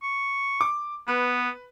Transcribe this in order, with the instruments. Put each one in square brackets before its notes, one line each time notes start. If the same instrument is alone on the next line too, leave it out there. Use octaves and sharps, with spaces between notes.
[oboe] C#6
[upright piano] D6
[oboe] B3 [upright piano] B4